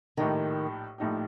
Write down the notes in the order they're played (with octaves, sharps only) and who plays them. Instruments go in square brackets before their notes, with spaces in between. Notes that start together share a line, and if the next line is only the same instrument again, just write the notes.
[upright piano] A#1 A2 A3 D#4 G4 [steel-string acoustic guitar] D#3
[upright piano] A#1 A2 A3 D#4 G4